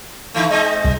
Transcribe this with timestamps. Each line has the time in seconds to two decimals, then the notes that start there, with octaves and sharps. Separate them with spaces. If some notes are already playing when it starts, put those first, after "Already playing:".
0.34 D3 E3 A3
0.50 G#3 C4 D#4 D#5
0.85 C2